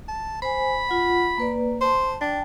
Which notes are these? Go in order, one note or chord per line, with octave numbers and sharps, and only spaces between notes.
A5
C5 G#5 B5
F4 F#5
A#3 B4 D5
C5 A5 C6
D4 G5 A5